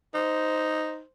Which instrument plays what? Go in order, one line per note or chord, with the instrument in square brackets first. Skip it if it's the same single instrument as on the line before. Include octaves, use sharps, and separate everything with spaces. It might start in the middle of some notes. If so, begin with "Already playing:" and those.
[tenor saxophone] D#4 [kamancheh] C5